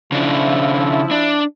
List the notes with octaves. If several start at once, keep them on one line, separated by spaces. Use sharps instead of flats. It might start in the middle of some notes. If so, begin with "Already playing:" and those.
C#3 F3 D4 E4
D4